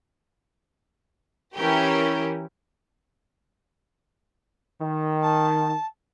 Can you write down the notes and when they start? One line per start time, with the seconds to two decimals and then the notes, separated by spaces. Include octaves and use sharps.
1.56 E3 C#4 E4 G4 A#4
4.81 D#3
5.22 A5